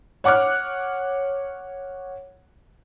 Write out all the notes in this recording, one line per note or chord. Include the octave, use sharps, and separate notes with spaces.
C#5 F#5 D6 F6 F#6